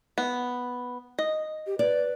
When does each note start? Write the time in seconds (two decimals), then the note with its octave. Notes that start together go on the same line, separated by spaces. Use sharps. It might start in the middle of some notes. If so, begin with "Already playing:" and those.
0.18 B3
1.19 D#5
1.67 G4
1.79 B4 D5